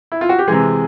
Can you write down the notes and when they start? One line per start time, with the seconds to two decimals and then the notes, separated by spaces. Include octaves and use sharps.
0.12 E4
0.21 F4
0.29 F#4
0.39 G4
0.48 C3 E3 G#3 G#4